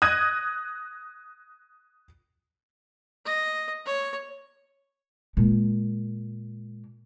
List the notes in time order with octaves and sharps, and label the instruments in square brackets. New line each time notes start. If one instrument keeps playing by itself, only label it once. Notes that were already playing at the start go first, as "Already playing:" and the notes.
[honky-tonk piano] D#6 F#6 G#6 A#6 D#7
[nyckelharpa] D#5
C#5
[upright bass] A#2 G#3